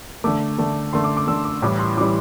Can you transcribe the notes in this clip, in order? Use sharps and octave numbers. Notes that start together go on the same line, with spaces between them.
D3 A3 D6
D3 A3
D3 A3 C6
D6
D6
D3 A3 E6
D6
A2 E3 G3 D6
C6
A2 E3 G3 D6